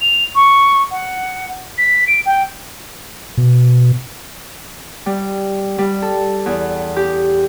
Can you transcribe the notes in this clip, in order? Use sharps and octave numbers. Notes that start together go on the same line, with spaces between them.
F7
C#6
F#5
B6
D7
G5
B2
G3
G3
A4
E2
G4